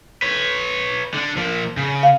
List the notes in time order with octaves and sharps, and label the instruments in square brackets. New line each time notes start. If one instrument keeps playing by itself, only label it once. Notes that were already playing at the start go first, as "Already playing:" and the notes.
[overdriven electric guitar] B4 C#5
D3 D4
F3 A#3
C#3
[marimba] F5